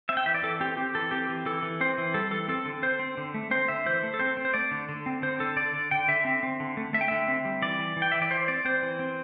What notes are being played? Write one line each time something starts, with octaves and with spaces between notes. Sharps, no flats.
C4 E5
G5
E3 E5
D5
E3 A4
C4 G4
C4 G4
E3 A4
C4 G4
E3
E3 A4
E3
C4 C5
E3
G3 A4
E3 A4
C4 A4
D3
C4 C5
C4
D3
A3
C4 C5
D3 E5
E3 C5
A3
A4
C4 C5
C4
C5
A3 D5
D3
D3
C4
D3 C5
D3 A4
D3 D5
D3
D3 G5
D3 E5
C4
C4
D3
A3
A3 E5
G5
D3 E5
C4
G3
E3 D5
E3
E3
G5
E3 E5
D5
E3 C5
C4 D5
C4 C5
E3
C4